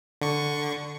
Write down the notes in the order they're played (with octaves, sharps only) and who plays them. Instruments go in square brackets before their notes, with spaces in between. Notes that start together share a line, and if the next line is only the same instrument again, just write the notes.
[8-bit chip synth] D3 C#6